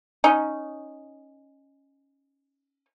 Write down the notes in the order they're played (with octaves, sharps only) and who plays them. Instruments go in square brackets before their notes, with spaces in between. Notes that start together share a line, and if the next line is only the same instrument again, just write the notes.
[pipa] C#4 D#4